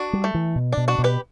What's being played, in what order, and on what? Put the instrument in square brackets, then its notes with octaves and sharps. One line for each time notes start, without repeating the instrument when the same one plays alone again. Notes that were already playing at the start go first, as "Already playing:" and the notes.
Already playing: [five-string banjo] D4 F#4
[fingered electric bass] G3
[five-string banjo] A3
[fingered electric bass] E3
B2
[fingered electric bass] B2 [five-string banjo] D4
[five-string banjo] D4 F#4
[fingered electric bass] B2
[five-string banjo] G4 B4